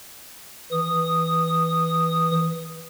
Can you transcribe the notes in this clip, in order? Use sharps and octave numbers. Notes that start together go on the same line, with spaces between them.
E3 D#6